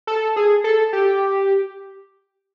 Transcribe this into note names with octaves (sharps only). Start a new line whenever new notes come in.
A4
G#4
A4
G4